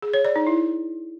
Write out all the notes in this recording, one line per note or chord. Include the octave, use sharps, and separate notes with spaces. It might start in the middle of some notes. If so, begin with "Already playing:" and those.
G#4
C#5
D5
D#4
E4